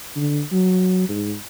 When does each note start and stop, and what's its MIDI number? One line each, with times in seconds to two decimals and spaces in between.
0.16 0.42 50
0.52 1.07 54
1.09 1.35 44